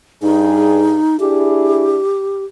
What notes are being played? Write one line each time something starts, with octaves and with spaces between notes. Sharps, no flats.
G2 D#4 G#4
D4 E4 G4 G#4